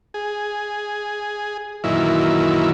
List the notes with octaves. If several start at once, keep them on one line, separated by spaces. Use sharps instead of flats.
G#4
F#2 A#2 D#3 E3 E4